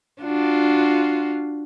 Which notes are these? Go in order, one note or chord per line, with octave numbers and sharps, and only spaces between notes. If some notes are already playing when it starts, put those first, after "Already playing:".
D4 F4 F#4